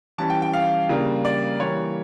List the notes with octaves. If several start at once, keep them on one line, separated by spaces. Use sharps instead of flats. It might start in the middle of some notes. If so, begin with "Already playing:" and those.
E3 G3 C#4 A5
G5
G5
F5
C#3 G3 A#3 D4
D5
E3 G3 A#3 C#5